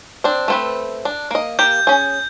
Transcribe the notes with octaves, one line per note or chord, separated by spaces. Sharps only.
C4 D4
A3 C4 B4
D4
A#3 D#5
A#3 G4 G6
C#4 G#4